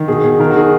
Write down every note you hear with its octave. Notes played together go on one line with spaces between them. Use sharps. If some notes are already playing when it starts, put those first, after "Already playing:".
Already playing: D#3
B2 G#4
B2 G#4
D#3 A#4
F#4
D#3 G#4